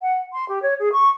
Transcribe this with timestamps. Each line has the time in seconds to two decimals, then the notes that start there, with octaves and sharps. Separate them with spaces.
0.02 F#5
0.32 C6
0.48 G4
0.62 C#5
0.79 G#4
0.92 C#6